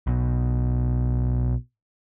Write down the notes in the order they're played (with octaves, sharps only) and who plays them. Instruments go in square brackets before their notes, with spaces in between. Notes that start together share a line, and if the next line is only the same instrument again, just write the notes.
[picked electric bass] B1 B2